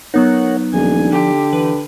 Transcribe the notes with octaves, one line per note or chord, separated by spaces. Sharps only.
F#3 B3 D#4 A#4 C#5 F#5
D#1 F3 D4 G#5
D3 G4
E3 B4